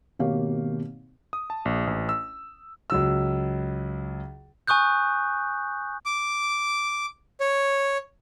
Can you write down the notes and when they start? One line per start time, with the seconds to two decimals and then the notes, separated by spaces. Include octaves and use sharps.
0.19 G#1 B2 A#3 G4 C#5 F5
1.33 D#6
1.50 A5
1.65 A#1
1.87 A1
2.09 E6
2.90 C#2 F#3 E6
4.67 G#5 C#6 D#6 F#6 G6
6.06 D6
7.40 C#5